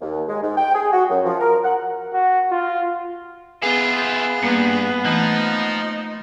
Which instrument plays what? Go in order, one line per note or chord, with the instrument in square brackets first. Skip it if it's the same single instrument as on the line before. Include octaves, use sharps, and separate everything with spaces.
[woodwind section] D#2
G#3
G#2
G5
G#4
F#4
F#2
F3
A#4
F#5
[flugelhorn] F#4
F4
[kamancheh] B3 [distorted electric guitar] E4 F4 [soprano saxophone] G#4
[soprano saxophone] G#4 [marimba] G6
[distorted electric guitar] G2 [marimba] A#3 [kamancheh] B3
[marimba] E3 A3 [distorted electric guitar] F3 [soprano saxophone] D#4